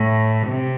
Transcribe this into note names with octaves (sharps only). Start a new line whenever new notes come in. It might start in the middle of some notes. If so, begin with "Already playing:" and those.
Already playing: A2
C3